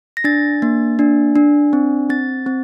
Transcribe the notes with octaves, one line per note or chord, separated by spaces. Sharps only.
A#6
D4 A6
A#3
D4
D4
C4
C4 A6
C4